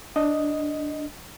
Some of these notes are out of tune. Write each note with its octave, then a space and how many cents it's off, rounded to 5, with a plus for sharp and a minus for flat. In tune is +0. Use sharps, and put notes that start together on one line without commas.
D4 +0 D#5 +0